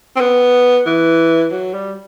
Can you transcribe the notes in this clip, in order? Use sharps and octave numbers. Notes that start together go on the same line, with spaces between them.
C4
B3
E3
F#3
G3